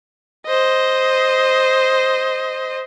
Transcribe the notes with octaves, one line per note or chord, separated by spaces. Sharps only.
C5 D#5